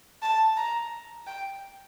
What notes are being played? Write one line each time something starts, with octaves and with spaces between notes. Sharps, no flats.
A5
A#5
G5